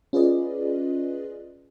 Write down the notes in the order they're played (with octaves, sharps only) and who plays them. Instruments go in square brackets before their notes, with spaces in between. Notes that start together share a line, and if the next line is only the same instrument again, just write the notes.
[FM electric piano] C#4 F4 G#4 B4 D5 D#5